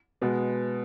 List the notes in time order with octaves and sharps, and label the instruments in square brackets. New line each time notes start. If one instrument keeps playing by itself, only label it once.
[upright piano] B2 G#3 B3